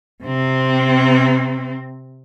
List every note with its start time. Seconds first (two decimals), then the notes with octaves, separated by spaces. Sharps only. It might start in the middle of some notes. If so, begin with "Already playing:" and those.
0.24 C3 C4